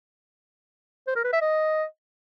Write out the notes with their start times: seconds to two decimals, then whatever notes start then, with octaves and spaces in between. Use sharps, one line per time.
1.07 C5
1.16 A#4
1.24 B4
1.33 E5
1.41 D#5